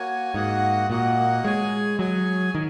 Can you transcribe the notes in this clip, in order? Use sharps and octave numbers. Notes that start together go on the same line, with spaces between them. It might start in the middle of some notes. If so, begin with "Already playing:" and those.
Already playing: A#3 F#4 C#5 G#5
G#2 A#3 F#4 D#5 F#5
A#2 A#3 F#4 D#5 F#5
G#3 G#4 C#5 G#5
F#3 G#4 C#5 G#5
D#3